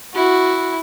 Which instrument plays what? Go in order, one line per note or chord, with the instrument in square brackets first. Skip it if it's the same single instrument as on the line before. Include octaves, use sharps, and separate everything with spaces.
[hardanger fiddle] E4 [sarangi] F#4